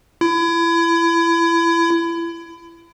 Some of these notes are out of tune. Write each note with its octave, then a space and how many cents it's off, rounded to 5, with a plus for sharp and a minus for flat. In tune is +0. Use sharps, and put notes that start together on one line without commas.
E4 +30